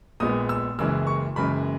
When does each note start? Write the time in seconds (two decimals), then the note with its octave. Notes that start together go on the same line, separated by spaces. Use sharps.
0.20 A#1 A#2 G#3 B3 D#6
0.49 E6
0.79 F#1 F#2 C#3 E3 G#3 E6
1.07 C#6
1.36 F#1 F#2 C#3 E3 G#3 B5